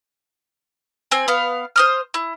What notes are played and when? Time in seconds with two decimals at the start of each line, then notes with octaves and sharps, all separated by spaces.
1.11 C4 G#5
1.28 B3 F5
1.76 C5 D#6 F6
2.14 E4